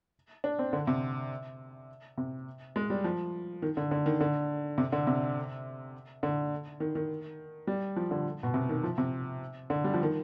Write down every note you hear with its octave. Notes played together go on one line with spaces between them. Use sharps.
D4
C4
D3
C3
C3
G#3
G3
F3
D#3
D3
D3
D#3
D3
C3
D3
C3
D3
D#3
D#3
G3
F3
D3
B2
C3
D#3
F3
C3
D3
G3
F3
D#3